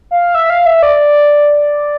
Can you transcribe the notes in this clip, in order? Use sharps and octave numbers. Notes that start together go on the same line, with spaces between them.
F5
E5
F5
E5
D5